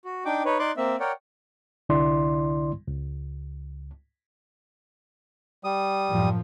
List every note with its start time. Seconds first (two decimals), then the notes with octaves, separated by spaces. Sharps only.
0.05 F#4
0.25 D4 D#4 G5 D6
0.45 D#4 B4 C#5
0.59 D#4 D5 C6 D6 F#6
0.77 A#3 C4 E5
1.00 A#4 C#5 D5 F#5 G5
1.89 C2 D3 E4 D5 C6
2.88 C#2
5.64 G3 D#6
6.10 F#2 A2 F3